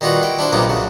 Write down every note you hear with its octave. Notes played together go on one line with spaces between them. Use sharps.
D#3 G3 D#4 F4 F#4 B4
E4 G5
D4 E4 C5
B1 C3 A#3 B3 D#4 F4
C#3 F#3